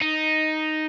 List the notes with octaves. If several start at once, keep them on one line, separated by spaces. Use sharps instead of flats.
D#4